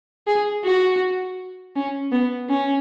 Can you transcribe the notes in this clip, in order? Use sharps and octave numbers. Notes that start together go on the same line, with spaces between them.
G#4
F#4
C#4
B3
C#4